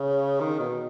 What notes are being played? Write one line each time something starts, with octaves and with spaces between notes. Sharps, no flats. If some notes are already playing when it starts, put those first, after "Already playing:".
Already playing: C#3
D#3
B2